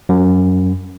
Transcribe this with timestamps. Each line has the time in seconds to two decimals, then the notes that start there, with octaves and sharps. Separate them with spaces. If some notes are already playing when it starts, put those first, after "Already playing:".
0.09 F#2